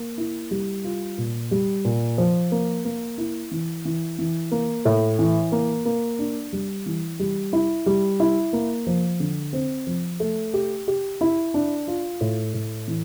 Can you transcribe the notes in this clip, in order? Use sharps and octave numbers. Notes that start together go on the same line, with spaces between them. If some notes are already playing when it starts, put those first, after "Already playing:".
Already playing: A#3
E4
G3
F4
A#2
G3
A#2
F3
A#3
A#3
E4
E3
E3
E3
A#3
A2
E3
A#3
A#3
D4
G3
E3
G3
E4
G3
E4
A#3
F3
D3
C4
F3
A3
G4
G4
E4
D4
F4
A2
A2
E3